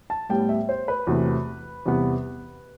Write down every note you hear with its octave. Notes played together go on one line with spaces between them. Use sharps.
A5
A2 G3 B3 G5
E5
C5
B4
E2 C3 F#3 A3
E2 C3 G3 B3